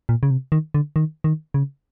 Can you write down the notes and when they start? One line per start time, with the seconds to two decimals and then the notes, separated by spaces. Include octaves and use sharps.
0.09 A#2
0.23 C#3
0.30 C3
0.52 D#3
0.74 D3
0.96 D#3
1.24 D#3
1.54 C#3